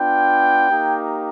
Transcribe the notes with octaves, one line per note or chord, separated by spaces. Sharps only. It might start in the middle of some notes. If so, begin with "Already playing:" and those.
Already playing: B3 D4 F4 G5
A#3 D#4 G4